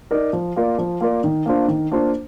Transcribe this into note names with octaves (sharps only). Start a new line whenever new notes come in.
D#4 A#4 D5
F3
A#3 F4 A#4 D5
F3
A#3 F4 A#4 D5
D#3
A#3 D4 F4 C5
D#3
A#3 D4 F4 C5